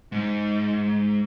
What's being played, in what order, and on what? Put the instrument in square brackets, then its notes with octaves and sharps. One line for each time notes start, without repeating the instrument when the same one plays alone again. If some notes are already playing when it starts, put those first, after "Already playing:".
[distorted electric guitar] G#2